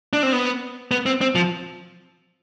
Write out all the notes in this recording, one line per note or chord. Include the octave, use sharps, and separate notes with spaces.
D4
C4
B3
B3
C4
C4
F3